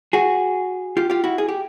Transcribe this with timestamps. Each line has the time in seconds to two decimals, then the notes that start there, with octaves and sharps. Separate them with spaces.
0.13 F#4 G#4
0.97 F4 G4
1.10 F4 G4
1.24 E4 F#4
1.38 G#4
1.48 G4